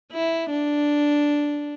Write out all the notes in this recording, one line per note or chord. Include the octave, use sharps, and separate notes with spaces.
E4
D4